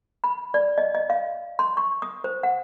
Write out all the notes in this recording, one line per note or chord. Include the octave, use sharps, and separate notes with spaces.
B5
D5
D#5
D#5
F5
C6
C#6
D#6
C5
F#5